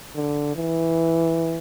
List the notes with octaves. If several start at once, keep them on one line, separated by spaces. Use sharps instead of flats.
D3
E3